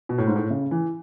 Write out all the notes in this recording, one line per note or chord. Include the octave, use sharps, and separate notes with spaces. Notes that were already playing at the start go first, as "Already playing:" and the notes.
B2
A2
G#2
A2
C#3
E3